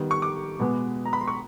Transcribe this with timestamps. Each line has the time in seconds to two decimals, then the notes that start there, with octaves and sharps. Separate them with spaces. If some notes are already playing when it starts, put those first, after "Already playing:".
Already playing: D#3 G3 B3
0.11 C#6
0.22 D6
0.59 B2 G#3 B3
1.06 A#5
1.13 B5
1.21 C6
1.28 C#6